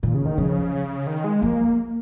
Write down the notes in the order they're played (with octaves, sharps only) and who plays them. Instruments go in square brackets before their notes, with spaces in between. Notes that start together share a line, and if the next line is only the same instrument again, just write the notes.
[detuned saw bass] A#2 [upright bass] D#3
[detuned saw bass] C#3
D#3
[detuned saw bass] C#3 [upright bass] F3
[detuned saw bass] D#3
G#3
[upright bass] F3 [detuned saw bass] A#3